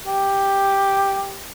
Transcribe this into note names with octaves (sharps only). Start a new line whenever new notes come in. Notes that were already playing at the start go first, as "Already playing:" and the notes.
G4